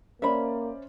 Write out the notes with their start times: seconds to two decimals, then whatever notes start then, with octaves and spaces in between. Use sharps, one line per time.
0.22 A#3 C#4 C5 D5 E5 B5